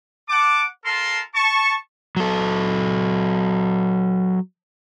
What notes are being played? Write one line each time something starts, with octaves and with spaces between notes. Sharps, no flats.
F#5 A5 D6
F4 A4 A#4 A5 C6
A5 C#6
F#3 A4